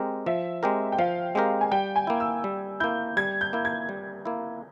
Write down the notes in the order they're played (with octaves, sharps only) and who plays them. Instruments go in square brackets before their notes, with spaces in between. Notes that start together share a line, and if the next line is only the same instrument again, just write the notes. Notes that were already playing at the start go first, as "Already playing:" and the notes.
Already playing: [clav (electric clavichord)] G#3 C4 G4 A#4
[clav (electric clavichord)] F3 [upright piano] E5
[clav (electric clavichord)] G#3 C4 G4 A#4
[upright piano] G5
[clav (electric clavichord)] F3 [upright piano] F5
[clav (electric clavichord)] G#3 C4 G4 A#4
[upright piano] G#5
[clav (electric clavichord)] G3 [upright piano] G5
[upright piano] G#5
[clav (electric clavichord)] A#3 E4
[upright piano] E6
[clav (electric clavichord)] G3
[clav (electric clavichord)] A#3 E4 [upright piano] G6
[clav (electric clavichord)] G3 [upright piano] G#6
[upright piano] G6
[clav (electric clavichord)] A#3 E4
[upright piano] G#6
[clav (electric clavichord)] G3
A#3 E4